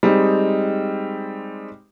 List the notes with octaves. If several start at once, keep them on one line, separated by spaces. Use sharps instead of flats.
G3 G#3 C4 D#4